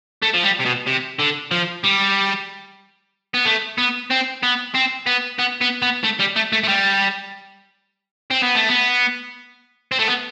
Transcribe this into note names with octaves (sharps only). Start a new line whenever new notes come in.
A3
F3
G3
C3
B2
C3
D3
F3
G3
B3
A3
B3
C4
B3
C4
B3
B3
B3
B3
A3
G3
A3
A3
A3
G3
C4
B3
A3
B3
C4
A3
B3